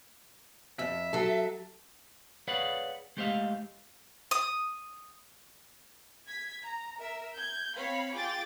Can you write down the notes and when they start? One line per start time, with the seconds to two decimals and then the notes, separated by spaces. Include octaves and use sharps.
0.79 F2 E5
1.13 F#3 A4
2.48 G#4 B4 C#5 D5 F5 F#5
3.17 G#3 A3 G4 C5 D#5 F5
4.31 D#6
6.27 G#6 B6
6.64 A#5
6.99 A#4 E5
7.35 G6 G#6
7.76 C4 C#5 F5 B5
8.14 F4 G#4 G5 D6 A6